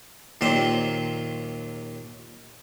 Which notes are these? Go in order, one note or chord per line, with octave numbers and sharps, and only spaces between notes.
D#2 A#2 F#3 C5 G5